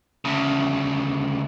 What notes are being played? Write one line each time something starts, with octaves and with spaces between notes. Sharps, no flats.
D2 C#3